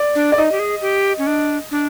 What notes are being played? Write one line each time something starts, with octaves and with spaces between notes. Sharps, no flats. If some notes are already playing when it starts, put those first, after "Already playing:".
Already playing: D5
D4
D5
D#4 D#5
G4
G#4
G4
C#4
D4
D4